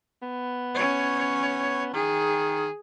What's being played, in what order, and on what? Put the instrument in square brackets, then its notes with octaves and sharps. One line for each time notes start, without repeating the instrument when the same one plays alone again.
[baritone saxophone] B3
[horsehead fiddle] C#4 C#5
[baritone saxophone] D#3 [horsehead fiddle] G#4